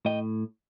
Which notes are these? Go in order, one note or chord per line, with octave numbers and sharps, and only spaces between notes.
A2 D#5 G5